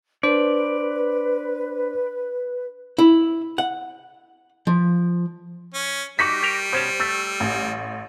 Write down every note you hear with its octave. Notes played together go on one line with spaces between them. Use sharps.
D4 B4 C5 D5
E4
F#5
F3
C#4
G3 D#4 F#4 C#6 D6 B6
G4 A#4
B2 C#4 C5 A5
A3 E6
A1